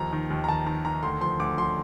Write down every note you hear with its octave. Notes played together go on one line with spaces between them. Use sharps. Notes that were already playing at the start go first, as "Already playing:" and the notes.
Already playing: D#2 F3 A#5
D#3
D#2
A#5
D#3 A5
D#3 A#5
D#3 A#5
D2 C6
F3 C6
D2 D6
F3 C6